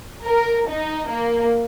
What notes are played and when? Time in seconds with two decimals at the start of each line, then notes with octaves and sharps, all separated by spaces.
0.25 A#4
0.69 D#4
1.10 A#3